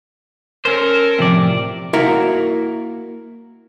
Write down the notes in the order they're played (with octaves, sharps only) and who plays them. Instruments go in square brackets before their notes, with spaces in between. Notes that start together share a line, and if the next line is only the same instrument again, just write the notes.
[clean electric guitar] C#4 C5 [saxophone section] A4 A#4
[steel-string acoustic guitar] A2 F3 [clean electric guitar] C3 D5
[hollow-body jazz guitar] A#3 E4 F#4 A#4